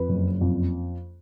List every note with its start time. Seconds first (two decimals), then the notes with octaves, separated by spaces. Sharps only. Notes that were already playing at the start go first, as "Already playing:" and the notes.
Already playing: F2 B4
0.09 F#1
0.41 F2